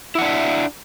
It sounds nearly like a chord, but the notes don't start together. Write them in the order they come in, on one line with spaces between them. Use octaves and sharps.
E4 F#5 D4 E5